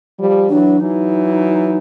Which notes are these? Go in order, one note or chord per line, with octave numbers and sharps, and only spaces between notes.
F3 G3
E3 F#3 D4
E3 F#3 D#4